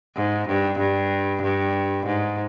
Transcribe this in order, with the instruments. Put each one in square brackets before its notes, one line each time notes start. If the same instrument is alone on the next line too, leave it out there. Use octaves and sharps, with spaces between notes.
[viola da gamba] G#2
G2
G2
G2
G#2